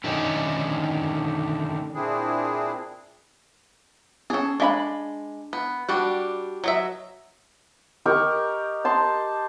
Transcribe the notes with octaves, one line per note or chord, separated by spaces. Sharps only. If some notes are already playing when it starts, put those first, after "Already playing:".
D3 D#3 A3 C#4 D#4
A#2 C4 D4 E4 G#4
C#4 D4 G#4 A4
G#3 D4 E5 B5
B3
G3 D4 F#4 F#5
F#3 D#5 E5
G4 A#4 D#5 C#6
D#5 A5 C6